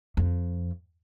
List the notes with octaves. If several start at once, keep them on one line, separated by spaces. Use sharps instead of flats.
F2